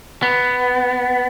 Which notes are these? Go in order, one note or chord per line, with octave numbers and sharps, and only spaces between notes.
B3